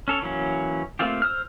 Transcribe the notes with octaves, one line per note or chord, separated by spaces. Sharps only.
C#4 A4 C#5
E3 F#3 A#3 C#4
A3 A#3 C4 F4 G4
C5 E6 F6